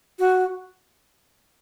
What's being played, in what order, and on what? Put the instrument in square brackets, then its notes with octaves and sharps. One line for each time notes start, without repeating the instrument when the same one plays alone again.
[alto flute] F#4